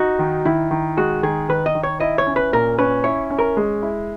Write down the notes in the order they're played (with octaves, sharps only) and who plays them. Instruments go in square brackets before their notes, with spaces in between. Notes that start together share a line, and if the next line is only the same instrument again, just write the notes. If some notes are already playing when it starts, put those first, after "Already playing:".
Already playing: [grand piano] D#4 [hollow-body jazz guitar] F#4
[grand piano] D#3
[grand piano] D#3 [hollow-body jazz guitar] E4
[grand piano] D#3
[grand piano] G#3 [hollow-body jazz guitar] F#4
[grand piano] D#3 [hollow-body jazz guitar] G#4
[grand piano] D#3 [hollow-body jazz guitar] B4
[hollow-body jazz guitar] D#5
[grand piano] D#3
[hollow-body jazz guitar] C#5
[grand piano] E4 [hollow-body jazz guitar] D#5
[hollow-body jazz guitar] C#5
[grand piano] C#4
[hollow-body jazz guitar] B4
[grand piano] A#2 [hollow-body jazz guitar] A#4
[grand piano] C#4 [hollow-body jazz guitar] B4
[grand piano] E4 [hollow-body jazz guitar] C#5
[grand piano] C#4
[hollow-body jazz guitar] A#4
[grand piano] G#3
E4